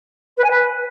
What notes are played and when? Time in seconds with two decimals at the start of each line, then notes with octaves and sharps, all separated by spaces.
0.37 B4
0.44 G#5
0.50 B4